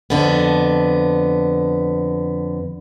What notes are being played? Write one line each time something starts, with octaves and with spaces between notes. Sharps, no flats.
F2 D3 B3